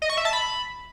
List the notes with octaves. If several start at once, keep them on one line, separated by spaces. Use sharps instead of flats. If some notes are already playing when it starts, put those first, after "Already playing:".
D#5
C#6
E5
A5
B5